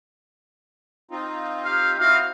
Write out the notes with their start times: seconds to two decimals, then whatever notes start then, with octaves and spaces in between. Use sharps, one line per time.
1.11 C4 D#4 F4
1.65 G4 F5
2.00 C4 E4 F#4 D#5 F5